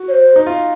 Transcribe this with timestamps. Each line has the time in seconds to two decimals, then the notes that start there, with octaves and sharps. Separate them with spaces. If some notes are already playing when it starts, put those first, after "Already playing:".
Already playing: F#4
0.08 C#5
0.12 C5
0.36 D#4
0.46 F4